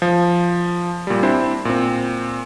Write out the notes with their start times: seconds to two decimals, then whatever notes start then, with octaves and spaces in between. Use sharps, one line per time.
0.02 F3
1.07 A#2 G3
1.23 C4 D4 E4 C5
1.65 A#2 C4